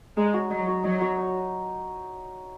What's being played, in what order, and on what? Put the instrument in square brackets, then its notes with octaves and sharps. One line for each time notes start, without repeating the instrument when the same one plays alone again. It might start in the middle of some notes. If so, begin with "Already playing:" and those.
[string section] G#3 [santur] D#4
[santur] F#4 C#5
[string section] F#3 [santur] D#4
[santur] F#4 C#5
[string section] F#3 [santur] D#4
[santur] F#4 C#5
D#4